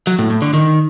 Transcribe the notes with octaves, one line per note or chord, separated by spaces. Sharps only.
F#3
A2
A2
D3
D#3